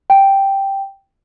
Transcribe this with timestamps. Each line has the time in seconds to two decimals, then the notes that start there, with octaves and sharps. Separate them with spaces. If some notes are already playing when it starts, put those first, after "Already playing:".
0.10 G5